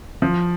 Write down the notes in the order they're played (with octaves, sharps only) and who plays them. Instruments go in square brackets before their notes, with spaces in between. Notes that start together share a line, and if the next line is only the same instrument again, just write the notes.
[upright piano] F3